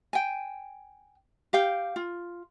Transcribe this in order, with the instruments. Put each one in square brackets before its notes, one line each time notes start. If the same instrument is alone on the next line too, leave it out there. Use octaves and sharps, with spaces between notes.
[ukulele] G5 G#5
G4 F5 G5
F4